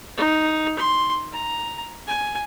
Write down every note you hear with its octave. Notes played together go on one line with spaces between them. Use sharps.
D#4
C6
A#5
G#5